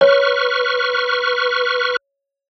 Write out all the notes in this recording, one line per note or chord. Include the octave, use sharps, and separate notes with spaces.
B4 C#5 C#6 F6